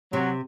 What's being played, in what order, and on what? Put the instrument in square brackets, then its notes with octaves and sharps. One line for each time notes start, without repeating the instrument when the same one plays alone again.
[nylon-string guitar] C3 [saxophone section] F#3